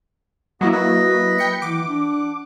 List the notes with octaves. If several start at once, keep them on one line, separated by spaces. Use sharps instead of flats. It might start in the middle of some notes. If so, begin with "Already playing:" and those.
F#3 A#3 B3 E4 F#4 D#5 F#5
B4 D#5 B5
G5 C#7
E3 F#5 D6
D4